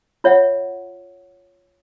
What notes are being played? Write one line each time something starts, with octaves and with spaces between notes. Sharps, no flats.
F4 C#5 E5 F#5